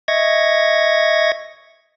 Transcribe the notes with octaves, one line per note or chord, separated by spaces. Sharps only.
D#5 E5 C#6 G#6 A#6